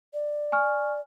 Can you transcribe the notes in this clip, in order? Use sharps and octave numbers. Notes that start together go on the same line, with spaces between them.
D5
G#5 C#6 F6